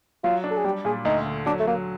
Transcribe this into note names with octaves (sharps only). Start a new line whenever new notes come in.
F#3 F4
D4
A4
G#4
G3 G4
A#2 G#4
D2 D#4
D3
F#3 D4
A3
F#3 A#3